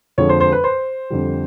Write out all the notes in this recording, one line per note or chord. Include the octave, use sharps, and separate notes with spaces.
F2 D3 F3 G#3 C#5
C5
C5
B4
C5
F2 D3 G3